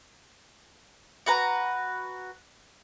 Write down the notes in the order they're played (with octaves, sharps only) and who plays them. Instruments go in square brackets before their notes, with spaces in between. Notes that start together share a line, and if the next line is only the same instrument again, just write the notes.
[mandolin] F#4 B4 A#5